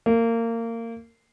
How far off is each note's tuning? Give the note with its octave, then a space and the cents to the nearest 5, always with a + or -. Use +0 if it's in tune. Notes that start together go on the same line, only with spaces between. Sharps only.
A#3 -25